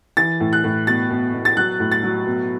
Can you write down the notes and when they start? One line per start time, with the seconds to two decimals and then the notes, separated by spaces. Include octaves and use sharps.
0.17 E3 A6
0.40 A2
0.53 F#6
0.64 A2
0.87 B2 A6
1.10 B2
1.34 B2
1.45 A6
1.56 F#3 F#6
1.80 A2
1.92 A6
2.03 F#3
2.26 B2